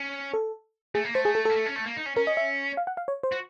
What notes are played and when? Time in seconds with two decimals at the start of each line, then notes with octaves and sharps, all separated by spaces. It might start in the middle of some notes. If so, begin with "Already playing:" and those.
Already playing: C#4
0.34 A4
0.95 A3 G#4
1.04 A#3
1.14 A3 C5
1.25 G#4
1.35 A4
1.45 A#3 A4
1.56 A3
1.66 C#4
1.76 A3
1.86 A#3
1.97 D#4
2.06 C#4
2.16 C#4 A#4
2.27 D#5
2.37 E5
2.77 F5
2.87 F#5
2.97 F5
3.08 C#5
3.23 C5
3.32 F#4